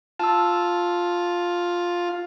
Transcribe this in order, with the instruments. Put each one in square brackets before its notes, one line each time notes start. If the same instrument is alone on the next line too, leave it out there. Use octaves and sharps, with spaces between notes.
[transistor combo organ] F4 [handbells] A5 E6